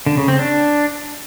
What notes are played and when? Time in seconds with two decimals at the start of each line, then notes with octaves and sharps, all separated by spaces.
0.06 D3
0.17 C#3
0.28 C4
0.39 D4